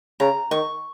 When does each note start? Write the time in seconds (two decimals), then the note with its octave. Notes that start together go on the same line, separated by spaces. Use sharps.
0.20 C#3 A#5
0.51 D#3 C#6